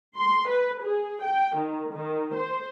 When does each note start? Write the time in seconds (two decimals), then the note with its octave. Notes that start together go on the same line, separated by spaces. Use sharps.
0.17 C6
0.49 B4
0.82 G#4
1.24 G5
1.57 D#3
1.93 D#3
2.35 C5